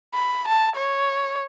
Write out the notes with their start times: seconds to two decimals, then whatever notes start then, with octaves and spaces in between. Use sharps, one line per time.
0.15 B5
0.48 A5
0.76 C#5